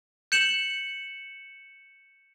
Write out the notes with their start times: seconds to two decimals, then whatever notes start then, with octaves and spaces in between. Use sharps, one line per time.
0.32 G6 C#7 E7 F#7